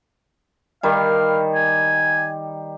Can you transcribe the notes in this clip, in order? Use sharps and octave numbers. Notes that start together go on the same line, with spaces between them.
D#3 G3 F5
G#5